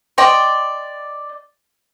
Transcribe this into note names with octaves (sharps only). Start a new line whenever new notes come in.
D5 D#5 G5 C6